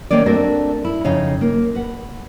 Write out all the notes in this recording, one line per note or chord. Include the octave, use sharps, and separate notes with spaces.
D2 B2 D#3 A#3 C#4 D5
A3 C4 D4 F#4 A#4
E4
F2 C#3 D#4 C#5 F5
A#3
B4 F#5